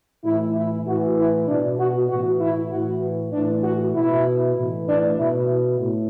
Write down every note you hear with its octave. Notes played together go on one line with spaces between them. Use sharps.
A2 E3 E4
E4
A2 E3 F#4
E4
B2 D4
F#4
A2 E3 F#4
E4
A2 E3 F#4
A2 E3 D4
F#4
B2 E4
A2 E3
D4
B2 E4
A2